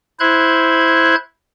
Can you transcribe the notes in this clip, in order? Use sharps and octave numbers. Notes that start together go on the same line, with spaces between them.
E4 C5 F#6 G#6